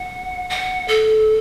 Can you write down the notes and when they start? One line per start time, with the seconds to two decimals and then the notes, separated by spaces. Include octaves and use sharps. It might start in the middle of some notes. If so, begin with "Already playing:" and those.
Already playing: F#5
0.50 F#5
0.88 A4